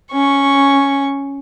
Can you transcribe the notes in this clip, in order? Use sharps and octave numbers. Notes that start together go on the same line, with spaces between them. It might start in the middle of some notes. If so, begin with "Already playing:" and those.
C#4 C#6